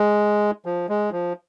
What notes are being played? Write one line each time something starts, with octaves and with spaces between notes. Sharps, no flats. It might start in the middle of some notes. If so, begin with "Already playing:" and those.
Already playing: G#3
F3
G#3
F3